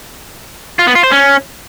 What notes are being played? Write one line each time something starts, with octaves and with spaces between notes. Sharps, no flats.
F4
B3
F4
C5
C#4